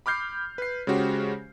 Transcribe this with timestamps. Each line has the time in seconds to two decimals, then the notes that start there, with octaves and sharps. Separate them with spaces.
0.06 B5 D6 F6 G6 C7
0.58 B4 C7
0.87 C#3 G#3 C#4 F#4 G4 C5